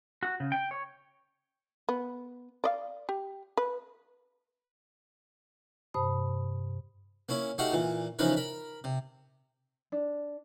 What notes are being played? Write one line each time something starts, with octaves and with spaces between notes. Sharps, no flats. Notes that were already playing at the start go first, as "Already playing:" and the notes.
F#4
C#3
G5
C#5
B3
D5 D#5 F5
G4
B4
G2 C3 C5 A5 B5 D#6
A#3 C#4 E4
A3 D#4 F#4 G4 F5 F#5
A#2 E3
C#3 E3 F3 D#4 A#4 B4
A#4 B5
C3
D4